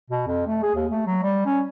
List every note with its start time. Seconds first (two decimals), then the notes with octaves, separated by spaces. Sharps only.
0.10 B2
0.27 F2
0.47 A3
0.63 G#4
0.75 D#2
0.91 A3
1.06 F#3
1.23 G3
1.46 C#4